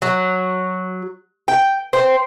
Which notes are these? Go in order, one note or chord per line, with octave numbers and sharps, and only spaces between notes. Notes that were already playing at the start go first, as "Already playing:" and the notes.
F#3
G5
C5 G5